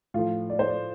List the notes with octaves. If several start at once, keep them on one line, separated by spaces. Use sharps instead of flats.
A2 F3 F4
D5
C5
D5